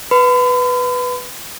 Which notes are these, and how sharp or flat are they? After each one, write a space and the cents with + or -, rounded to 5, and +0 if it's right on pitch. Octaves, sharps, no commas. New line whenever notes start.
B4 +0 B5 +45